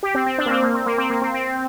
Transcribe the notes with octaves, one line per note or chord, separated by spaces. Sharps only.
G4
C4
C4
D4
A#3
C4
A#3
C4
A#3
C4
A#3
C4
C4